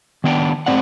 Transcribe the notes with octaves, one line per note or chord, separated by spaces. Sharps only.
D#3 B3 D4 G5
G#2 D#3 C4 D5 F#5